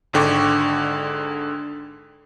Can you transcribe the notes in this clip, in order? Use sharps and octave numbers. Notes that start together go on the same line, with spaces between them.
G#1 G#2 D3 G5 C#6 D6